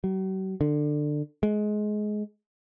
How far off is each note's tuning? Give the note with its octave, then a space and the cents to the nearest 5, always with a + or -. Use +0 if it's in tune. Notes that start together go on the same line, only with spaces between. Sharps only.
F#3 +45
D3 +20
G#3 +20